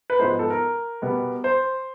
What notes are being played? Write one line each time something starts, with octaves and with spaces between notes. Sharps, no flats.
B4
G#2 F3 G#3 B3 C5
A4
A#4
B2 G3 B3
C5